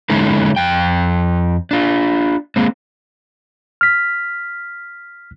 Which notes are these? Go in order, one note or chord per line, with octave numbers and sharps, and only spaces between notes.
D3 G#3 C#4 D#4 E4 A4
F2 G5
D4 F4
G#3 A#3 C4
F6 B6